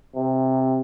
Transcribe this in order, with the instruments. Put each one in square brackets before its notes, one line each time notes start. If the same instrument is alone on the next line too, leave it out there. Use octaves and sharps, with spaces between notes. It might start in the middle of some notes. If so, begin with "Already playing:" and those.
[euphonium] C3